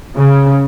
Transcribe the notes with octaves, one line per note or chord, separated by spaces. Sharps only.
C#3